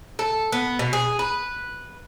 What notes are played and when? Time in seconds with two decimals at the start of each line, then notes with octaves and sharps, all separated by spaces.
0.19 A4
0.52 B3
0.79 B2
0.93 G#4
1.19 B4